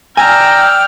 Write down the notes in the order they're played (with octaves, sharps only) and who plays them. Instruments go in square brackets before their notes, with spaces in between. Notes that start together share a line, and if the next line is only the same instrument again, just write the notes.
[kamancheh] D5 G5 [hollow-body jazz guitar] G#5 [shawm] A#5 [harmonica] E6 F6